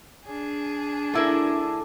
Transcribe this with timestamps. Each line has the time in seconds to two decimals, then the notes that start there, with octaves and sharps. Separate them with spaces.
0.25 D4 G#4
1.14 D3 A3 E4 A#4